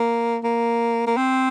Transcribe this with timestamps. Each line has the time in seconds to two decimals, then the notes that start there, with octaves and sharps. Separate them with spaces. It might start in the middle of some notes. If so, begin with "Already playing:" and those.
Already playing: A#3
0.44 A#3
1.07 A#3
1.17 C4